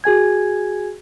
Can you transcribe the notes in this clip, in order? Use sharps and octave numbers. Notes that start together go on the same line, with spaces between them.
F#4 G#4 G#5 G#6